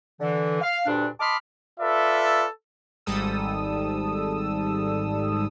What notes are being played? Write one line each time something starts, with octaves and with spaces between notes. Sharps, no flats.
D3 E3
F5
D2 G2 A#2 D4
D#5 A5 B5 C6 D6 F6
F4 A4 B4 D5 E5
G#1 G#2 G3 A4 D#6 E6